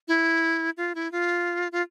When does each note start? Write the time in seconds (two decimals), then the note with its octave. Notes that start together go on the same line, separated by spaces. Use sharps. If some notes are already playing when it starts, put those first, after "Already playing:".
0.08 E4
0.77 F4
0.95 E4
1.12 F4
1.72 F4